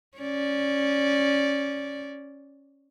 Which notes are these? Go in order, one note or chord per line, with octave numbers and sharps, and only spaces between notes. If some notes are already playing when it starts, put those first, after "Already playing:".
C#4 D5